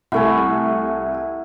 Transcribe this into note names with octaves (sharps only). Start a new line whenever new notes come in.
C2 A3 E4 F#5 G#5 C#6